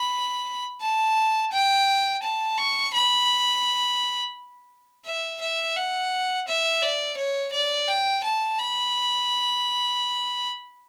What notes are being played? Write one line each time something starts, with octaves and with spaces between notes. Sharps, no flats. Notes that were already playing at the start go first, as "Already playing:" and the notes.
Already playing: B5
A5
G5
A5
C#6
B5
E5
E5
F#5
E5
D5
C#5
D5
G5
A5
B5